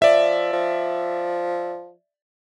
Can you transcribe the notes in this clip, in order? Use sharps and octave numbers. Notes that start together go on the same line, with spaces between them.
F3 D5 E5
F3